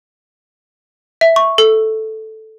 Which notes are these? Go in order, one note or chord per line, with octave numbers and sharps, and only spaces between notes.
E5
C#6
A4